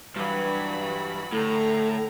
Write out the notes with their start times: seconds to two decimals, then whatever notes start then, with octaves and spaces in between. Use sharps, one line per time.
0.16 G2 E3 F#3 B5
1.33 A2 D3 A4 A#5